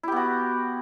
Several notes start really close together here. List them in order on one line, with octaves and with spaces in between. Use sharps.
E4 G4 B3 F#4